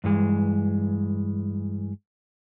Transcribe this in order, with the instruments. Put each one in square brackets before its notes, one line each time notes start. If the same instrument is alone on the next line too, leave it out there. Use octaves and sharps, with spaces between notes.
[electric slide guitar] G2 E3 G#3